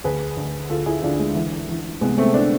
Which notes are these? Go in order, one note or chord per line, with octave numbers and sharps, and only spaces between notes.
D2 G#4 B4
D2
D2 F4 A4
E4 G#4
D2 D4 F4
G#3
E3
E3
C2 G#3 B3
A3 C4
B3 D4